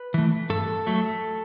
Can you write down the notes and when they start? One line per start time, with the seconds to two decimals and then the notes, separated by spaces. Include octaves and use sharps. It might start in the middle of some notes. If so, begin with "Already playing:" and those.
Already playing: B4
0.14 E3 A3
0.50 G2 A4
0.86 F#3 A3